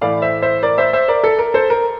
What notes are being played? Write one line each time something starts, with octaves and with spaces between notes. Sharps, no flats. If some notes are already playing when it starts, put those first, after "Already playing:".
A2 E3 A3 E4 D5 F5
C5 E5
C5 E5
A#4 D5
C5 E5
C5 E5
A#4 D5
A4
A#4
A4 C5
A#4